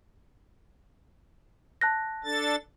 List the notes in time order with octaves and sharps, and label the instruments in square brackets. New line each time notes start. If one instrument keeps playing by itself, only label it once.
[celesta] A5 F#6 A#6
[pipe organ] D4 A4 A6